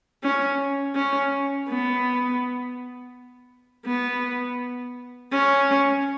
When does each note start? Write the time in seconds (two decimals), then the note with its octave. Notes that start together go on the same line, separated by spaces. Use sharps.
0.23 C#4
0.95 C#4
1.69 B3
3.86 B3
5.32 C#4